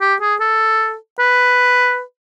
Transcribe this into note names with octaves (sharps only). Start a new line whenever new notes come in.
G4
G#4
A4
B4